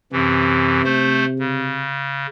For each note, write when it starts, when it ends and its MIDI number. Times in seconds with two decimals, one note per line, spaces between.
0.13 0.82 42
0.13 1.90 48
0.13 0.82 52
0.84 1.25 57
0.84 1.25 72
1.39 2.27 49